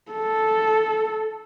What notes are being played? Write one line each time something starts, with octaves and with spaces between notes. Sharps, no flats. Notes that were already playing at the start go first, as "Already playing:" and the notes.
A4